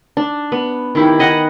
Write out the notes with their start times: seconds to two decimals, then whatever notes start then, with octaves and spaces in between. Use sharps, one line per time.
0.17 D4
0.52 B3
0.95 D#3 E4 G4
1.19 B4 D#5 F#5 G#5